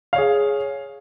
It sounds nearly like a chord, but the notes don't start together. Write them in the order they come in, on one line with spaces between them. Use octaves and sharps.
F5 C#5 G#4